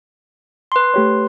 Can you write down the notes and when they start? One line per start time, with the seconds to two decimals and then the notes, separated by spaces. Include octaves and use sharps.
0.72 B4 C6
0.94 A3 G4 C#5